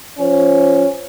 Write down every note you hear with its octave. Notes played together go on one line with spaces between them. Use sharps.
F3 C#4